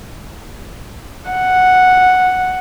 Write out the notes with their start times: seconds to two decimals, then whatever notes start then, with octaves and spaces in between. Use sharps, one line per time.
1.30 F#5